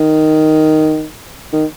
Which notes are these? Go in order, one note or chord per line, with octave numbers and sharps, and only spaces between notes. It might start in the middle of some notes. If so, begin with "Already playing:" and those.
Already playing: D#3
D#3